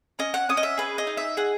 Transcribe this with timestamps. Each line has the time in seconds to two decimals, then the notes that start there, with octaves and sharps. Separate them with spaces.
0.19 C#4 D#5
0.34 F#5
0.49 C#4 D#6
0.57 D#5
0.63 E5
0.78 G#4 B4
0.98 D#5
1.07 D#4
1.17 E5
1.37 G#4 F#5